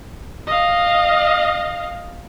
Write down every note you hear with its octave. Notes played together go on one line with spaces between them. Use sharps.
D#5 F5